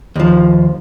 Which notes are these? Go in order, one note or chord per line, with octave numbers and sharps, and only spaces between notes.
D#2 F3